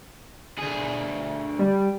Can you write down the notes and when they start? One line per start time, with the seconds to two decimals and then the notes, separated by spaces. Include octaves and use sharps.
0.59 D2 G#4
1.59 G3